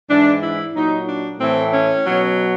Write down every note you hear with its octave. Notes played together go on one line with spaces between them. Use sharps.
G#2 E3 D4
E4
A#2 F#3 D#4
D4
A2 E3 C4
C#4
B2 F#3